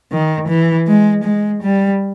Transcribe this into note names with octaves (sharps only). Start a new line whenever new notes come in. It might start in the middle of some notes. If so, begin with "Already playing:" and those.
D#3
E3
G#3
G#3
G3